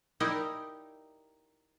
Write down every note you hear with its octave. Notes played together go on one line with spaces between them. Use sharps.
D#4 E4 G4 A#4 D5